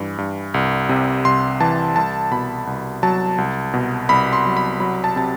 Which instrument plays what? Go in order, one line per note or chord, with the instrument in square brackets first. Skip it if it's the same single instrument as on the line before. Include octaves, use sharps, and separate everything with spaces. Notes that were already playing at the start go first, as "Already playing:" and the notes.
Already playing: [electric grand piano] G2 E3
G2
C2
C3
C2 C6
E3 A5
C2 A5
B2 B5
C2
F#3 A5
C2
B2
C2 B5
C6
F#3
B5
F#3 B5
A5
C3 A5